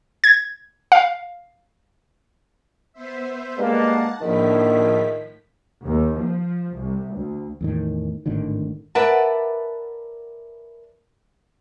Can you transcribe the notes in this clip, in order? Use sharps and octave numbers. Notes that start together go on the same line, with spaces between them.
G#6
F5
B3 C5 E5
G2 G#3 A#3 F#5 A5
A#1 A2 D3 D#3 F3 E4 B6
D#2
F3
C2
D2
E2 A2 D#3
G#1 A2 D3 D#3
A#4 B4 D5 E5 F#5 A5